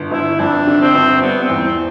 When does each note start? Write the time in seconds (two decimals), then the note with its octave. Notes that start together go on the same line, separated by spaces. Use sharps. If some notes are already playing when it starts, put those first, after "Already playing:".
Already playing: G1 D3
0.11 G1 E4
0.39 F2 D4
0.67 D3
0.81 C4
0.95 G1
1.22 G3 B3
1.43 C4
1.50 E2
1.62 C4